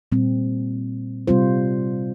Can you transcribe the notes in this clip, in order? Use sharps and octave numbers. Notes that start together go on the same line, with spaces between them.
A#2 G3 C4
C3 G3 C4 F4 C5